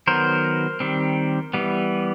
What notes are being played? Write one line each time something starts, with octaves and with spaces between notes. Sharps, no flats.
D#3 F#3 B3 A#4 C5
D#3 G3 C4
E3 G3 B3